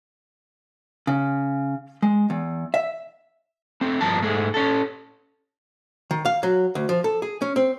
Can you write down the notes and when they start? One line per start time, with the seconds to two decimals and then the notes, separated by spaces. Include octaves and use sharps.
1.07 C#3
2.03 G#3
2.30 E2
2.74 E5
3.81 A3 C4
4.01 G2 F3 A#4 A5
4.22 G#2 G#3 A3
4.54 C#4 A4
6.11 D#3
6.25 F5
6.43 F#3
6.75 D2
6.89 F3
7.04 A4
7.22 G#4
7.42 C#4
7.56 C4